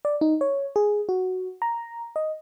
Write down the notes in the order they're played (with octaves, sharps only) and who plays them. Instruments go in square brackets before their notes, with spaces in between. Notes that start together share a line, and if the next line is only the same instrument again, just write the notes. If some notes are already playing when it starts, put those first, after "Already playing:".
[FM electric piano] D5
D#4
C#5
G#4
F#4
A#5
D#5